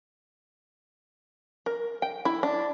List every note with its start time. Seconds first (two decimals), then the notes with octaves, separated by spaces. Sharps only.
1.66 A#4
2.02 G5
2.25 E4
2.43 D4